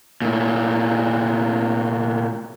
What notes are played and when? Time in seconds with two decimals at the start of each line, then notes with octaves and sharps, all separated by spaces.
0.22 A#2 A3